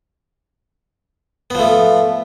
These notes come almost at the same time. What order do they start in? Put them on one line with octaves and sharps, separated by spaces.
B3 F3 A3